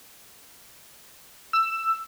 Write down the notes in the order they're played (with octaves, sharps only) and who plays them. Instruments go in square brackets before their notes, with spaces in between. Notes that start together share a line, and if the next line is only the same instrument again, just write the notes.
[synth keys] E6